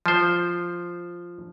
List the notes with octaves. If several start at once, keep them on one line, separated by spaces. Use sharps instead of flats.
F3 C5